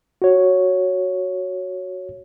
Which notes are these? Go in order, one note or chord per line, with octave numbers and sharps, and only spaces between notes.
F#4 C#5